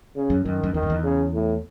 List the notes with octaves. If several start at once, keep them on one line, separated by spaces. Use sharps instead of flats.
C#3
F#2
F#2 D#3
F#2
E2 D#3
F#2
E2
C#3
A2